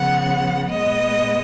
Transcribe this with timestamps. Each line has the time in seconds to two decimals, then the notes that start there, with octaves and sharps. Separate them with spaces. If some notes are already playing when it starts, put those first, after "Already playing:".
Already playing: C#3 F3 B3 F#5
0.69 A#2 G#3 B3 D#5